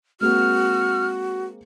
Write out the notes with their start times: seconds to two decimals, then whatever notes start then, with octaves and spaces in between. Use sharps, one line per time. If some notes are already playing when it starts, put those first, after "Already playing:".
0.21 G#3 A#3 C4 F#4 F6